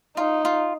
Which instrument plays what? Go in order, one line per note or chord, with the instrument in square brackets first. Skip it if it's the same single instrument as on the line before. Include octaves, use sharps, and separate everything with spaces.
[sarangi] D#4 [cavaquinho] F4
[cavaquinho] F4